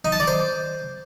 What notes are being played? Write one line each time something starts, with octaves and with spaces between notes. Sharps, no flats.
D#4
A5
D5
C5